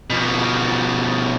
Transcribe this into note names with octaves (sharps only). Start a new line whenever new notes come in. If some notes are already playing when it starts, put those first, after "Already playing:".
B2 F3